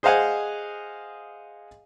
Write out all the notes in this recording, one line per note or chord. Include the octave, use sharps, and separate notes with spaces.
G#4 C5 D#5 F5 F#5 G#5